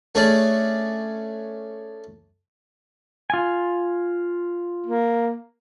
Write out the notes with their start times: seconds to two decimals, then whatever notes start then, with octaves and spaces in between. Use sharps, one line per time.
0.15 A3 C#4 D4 G#4 D5
3.30 F4 G#5
4.86 A#3